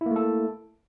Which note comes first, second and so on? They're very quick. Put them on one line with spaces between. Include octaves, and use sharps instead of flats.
E4 A#3 A3 A4